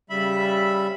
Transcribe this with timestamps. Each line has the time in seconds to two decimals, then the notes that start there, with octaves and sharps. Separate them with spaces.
0.10 C#3 G3 E5 B5